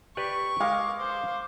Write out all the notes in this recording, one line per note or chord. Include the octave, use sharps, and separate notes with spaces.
G4 B4 D5 C#6
G#3 A#4 F5 D6
C5